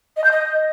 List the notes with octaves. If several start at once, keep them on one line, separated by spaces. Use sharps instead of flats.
D#5
G6
D#5